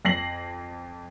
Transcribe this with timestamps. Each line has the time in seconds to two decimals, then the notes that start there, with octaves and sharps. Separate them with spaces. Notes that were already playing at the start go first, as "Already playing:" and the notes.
0.05 F2 A#6 C7 F#7